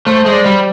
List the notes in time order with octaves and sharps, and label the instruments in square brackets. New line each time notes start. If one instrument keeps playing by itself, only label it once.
[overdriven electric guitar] A3 [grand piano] C5
[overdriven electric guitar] G#3
[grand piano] D5
[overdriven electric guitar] G3